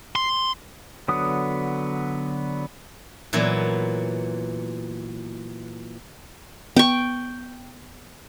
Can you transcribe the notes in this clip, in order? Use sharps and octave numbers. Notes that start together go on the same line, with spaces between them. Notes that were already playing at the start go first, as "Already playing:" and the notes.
C6
D3 F#3 B3 F#5 D#6
A#2 E3 F#3 B3 E4
B3 G5 C#6